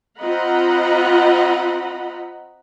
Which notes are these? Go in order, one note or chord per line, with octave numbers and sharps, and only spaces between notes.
C4 F4 D#5 F#5 A#5 B5